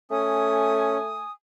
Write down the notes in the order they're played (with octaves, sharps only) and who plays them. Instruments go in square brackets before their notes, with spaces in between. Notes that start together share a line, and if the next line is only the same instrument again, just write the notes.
[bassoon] A3 [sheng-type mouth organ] C#4 [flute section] G#5 D#6